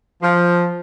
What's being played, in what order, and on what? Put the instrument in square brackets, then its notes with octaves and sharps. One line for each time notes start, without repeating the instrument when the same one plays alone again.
[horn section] F3